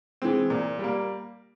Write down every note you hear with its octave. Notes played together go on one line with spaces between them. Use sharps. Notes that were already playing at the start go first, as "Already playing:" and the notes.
E3 G#3 C4
A#2
G3 A#3